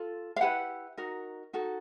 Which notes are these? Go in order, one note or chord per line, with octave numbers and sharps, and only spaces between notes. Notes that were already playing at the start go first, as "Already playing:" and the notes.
Already playing: F4 A4
F5
E4 G4 B4 F#5
D#4 F#4 A#4
D#4 F#4 A4